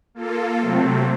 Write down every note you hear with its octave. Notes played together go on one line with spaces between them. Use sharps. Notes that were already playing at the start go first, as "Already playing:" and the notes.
A#3 F4 A4
C3 F#3 A3 C4